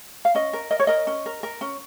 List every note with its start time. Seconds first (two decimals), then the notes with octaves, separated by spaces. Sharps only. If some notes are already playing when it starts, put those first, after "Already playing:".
0.25 F5
0.35 C#4 D#5
0.53 A#4
0.71 A#4 D#5
0.80 C#5
0.87 A#4 D#5
1.07 C#4
1.26 A#4
1.43 A#4
1.61 C#4